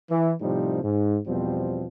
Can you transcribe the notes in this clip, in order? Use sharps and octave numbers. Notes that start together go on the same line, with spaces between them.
E3
A2 C3 F3 G3 D#4
G#2
E2 B2 F3 G3 C4